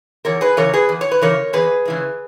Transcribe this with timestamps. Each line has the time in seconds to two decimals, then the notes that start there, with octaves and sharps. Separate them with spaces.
0.25 E2 A#4 C#5
0.41 G#4 B4
0.57 C#3 E3 A#4 C#5
0.73 G#4 B4
0.89 E2
1.01 C#5
1.11 B4
1.21 C#3 E3 A#4 C#5
1.53 E2 G#4 B4
1.85 C#3 E3 G#3